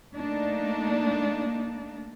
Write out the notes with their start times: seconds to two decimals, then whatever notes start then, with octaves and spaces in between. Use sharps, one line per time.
0.14 A3 A#3 D4 D#4